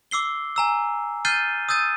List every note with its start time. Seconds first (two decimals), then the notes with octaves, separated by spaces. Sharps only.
0.11 D6 E6 C7 G7
0.56 G#5 A#5 E6
1.25 F6 G6 A6 C7 D#7 G7
1.69 D#6 E6 G6 A6 D#7